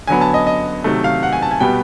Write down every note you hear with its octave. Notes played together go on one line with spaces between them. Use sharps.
D3 F#3 B3 G#5
A5
D#5
D#5
C3 D#3 F#3 A3
F5
F#5
G#5
A5
G#5
B2 G3 B3 G5